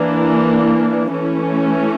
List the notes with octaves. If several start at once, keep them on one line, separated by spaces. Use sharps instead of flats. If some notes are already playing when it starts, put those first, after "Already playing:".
Already playing: E3 A#3 D4
E3 A3 C#4